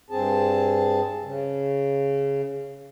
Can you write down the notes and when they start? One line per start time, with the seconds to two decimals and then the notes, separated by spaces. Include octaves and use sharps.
0.10 G2 C4 G#4 A5
1.22 C#3